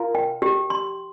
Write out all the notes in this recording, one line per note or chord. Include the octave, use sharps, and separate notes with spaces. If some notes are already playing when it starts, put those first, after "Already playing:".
Already playing: F4 A#4
G5
G4
C6